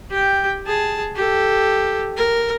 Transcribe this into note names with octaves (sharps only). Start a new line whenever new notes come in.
G4 G5
G#4 A5
G4 A4
A#4